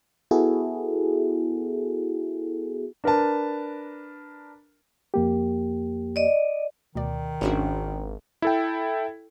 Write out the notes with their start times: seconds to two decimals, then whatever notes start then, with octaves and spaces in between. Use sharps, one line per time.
0.31 B3 E4 F#4 G#4 A4
3.04 D4 A#4 B4 A5
5.14 F2 A#3 G4
6.16 D5 D#5
6.95 D2 B2 D#3 D5
7.41 G#1 C#4 D4 F#4
8.42 E4 A4 G5